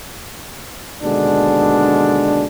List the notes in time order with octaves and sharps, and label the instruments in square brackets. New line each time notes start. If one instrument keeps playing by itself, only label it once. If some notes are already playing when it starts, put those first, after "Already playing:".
[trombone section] D#2 B2 D3 G#3 D4